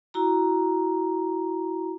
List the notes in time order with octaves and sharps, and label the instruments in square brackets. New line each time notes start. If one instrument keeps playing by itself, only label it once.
[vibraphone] E4 F#4 A#5